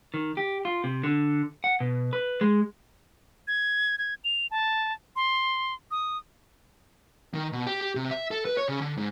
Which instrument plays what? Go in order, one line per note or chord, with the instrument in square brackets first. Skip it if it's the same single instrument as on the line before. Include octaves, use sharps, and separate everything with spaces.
[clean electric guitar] D#3
G4
F4
C3
D3
F#5
B2
B4
G#3
[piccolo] G#6
G#6
F7
A5
C6
D#6
[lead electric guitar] D#3
B2
G4
G4
C3
E5
A4
B4
C#5
C#3
D3
G#2